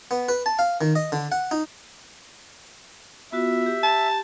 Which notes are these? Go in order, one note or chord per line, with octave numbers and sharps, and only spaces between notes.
B3
B4
A5
F5
D#3
D#5
D3
F#5
D#4
B3 F4 F#4 E5
G4
A5